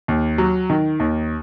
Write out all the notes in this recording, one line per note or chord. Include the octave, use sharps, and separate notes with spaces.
D#2
F#3
D#3
D#2